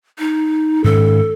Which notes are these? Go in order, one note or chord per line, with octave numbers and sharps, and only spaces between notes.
D#4
G#2 D#3 C#4 A4